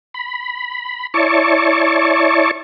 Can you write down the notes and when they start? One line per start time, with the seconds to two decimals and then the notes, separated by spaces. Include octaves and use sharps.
0.14 B5
1.14 E4 C#5 D5 A5 C#6